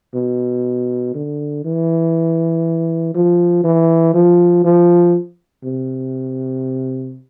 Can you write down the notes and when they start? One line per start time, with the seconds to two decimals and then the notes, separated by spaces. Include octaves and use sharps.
0.15 B2
1.15 D3
1.65 E3
3.14 F3
3.64 E3
4.14 F3
4.64 F3
5.64 C3